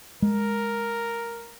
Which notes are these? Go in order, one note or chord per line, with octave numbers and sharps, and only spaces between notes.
G#3 A#4